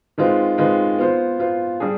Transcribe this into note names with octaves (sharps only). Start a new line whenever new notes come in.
D#3 G#3 C4 F4 B4
D#3 G#3 C4 F4 B4
B3 F4 C5
B3 F4 C5
G3 D4 G#4